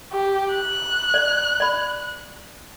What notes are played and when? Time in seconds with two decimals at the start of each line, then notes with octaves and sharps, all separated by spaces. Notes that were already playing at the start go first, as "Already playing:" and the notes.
0.12 G4
0.54 F#6
1.14 D5
1.60 D5 B5